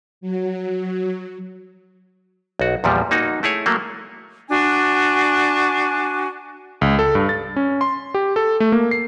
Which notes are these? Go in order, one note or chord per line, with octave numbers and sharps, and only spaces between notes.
F#3
B1 F#4
E2 A#2 F3 G3
A#3 D#4 F#4
A3 E4 G#4 C#5
F#3 A3 A#3
D4 F#4 G#5
C#2
A4
G2
A6
C#4
C6
G4
A4
A3
A#3
C7